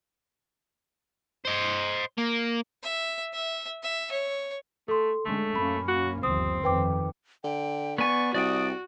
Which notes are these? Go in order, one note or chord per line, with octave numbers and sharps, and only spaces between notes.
C5 D#5
A#3
E5
E5
E5
C#5
A3 A4 C6
D3 G#3 A3 C#4
F#2 A#3 C#4 B5
F#4
G1 D#2 F3 C4 D#6
F2 D#3 B4 G5 D6
D3 G5
B3 D5 G#5 C#6
C2 F#4 D5 G5 D#6